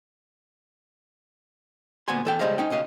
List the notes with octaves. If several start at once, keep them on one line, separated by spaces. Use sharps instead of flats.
D2 A#2 B3 G#5 C6
E2 A4 G5
C#2 G3 G#3 C5 D#5 F5
C#4 D#4 G5
C#2 B2 D#5 F5